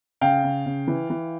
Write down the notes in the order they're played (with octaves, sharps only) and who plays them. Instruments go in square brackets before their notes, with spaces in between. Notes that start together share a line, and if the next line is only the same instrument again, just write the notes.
[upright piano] C#3 F5 G5
C#3
C#3
E3
E3